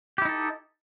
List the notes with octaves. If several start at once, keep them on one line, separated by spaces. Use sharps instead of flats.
D#4 E4 G4 A4